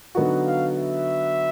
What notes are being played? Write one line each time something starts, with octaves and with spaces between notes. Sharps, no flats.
D3 F#3 B3 D#4 F#4
F5
E5